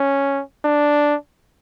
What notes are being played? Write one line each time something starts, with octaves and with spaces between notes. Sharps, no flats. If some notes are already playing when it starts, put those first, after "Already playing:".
Already playing: C#4
D4